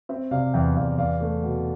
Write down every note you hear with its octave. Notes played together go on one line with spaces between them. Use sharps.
C4 E5
C3 D5 F5
E2 E5 G5
E2 D5 F5
E2 D5 F5
A3
B2